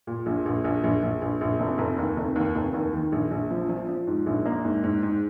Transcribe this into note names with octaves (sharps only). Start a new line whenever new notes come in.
A#2
A#1
A#1
A#1
A#1
A#1
A#1
A#1
F1
F1
D#2
F1
D#2
F1
D#2
D#3
A#1
A#1
F3
F3
F3
G#2
A#1
A#3
G#2
G#2
G#2